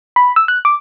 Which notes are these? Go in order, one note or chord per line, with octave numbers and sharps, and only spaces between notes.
B5
E6
F#6
D6